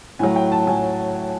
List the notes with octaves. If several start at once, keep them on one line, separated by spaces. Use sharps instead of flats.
A2 F#3 G#5
G5
A5
A2 F#3 G#5